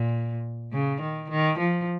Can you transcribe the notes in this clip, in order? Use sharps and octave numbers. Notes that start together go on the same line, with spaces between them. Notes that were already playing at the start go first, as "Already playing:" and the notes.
Already playing: A#2
C#3
D#3
D#3
F3